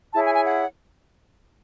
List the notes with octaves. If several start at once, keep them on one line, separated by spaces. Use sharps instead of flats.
E4 G#4 C#5 A5
G#5
G#5
F#5